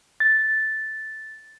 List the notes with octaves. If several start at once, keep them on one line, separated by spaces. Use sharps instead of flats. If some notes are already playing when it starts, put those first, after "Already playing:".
A6